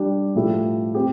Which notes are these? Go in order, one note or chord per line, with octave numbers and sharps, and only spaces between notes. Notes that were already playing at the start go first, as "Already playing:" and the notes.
Already playing: G3 D4 G4
A2 F3 A3 E4 G4
C4 G4